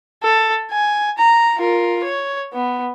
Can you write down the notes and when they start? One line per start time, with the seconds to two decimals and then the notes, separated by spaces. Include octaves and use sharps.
0.23 A4
0.71 G#5
1.18 A#5
1.58 F4 A#4
2.04 C#5
2.53 B3